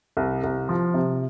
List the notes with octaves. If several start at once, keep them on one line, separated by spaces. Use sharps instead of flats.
C2
C2
F3
C3